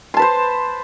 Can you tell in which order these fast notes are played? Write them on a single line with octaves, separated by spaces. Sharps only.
C6 A5 B4 C5